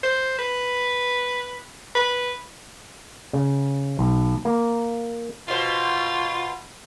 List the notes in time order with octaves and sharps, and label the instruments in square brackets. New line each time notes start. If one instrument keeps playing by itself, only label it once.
[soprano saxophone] C5
B4
B4
[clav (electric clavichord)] C#3
B1
A#3
[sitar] B2 C5 [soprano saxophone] F4